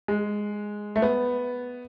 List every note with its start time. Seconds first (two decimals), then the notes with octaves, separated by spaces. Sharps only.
0.08 G#3
0.96 A3
1.02 B3